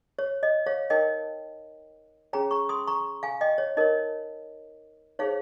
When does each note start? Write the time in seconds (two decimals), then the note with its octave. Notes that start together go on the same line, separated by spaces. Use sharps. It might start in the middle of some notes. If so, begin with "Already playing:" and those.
0.19 C#5
0.43 D#5
0.66 C#5 F5
0.90 D#4 A#4 C#5 D#5 G5
2.33 C#4 G#4 C#5 G5 A#5
2.51 A#5 C#6
2.69 C6 D#6
2.87 A#5 C#6
3.23 F5 G#5
3.41 D#5 G5
3.58 C#5
3.77 D#4 A#4 C#5 D#5
5.19 D#4 G#4 C5 C#5 F5